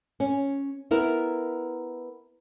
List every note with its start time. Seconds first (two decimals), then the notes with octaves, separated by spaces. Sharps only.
0.20 C#4
0.91 B3 E4 A#4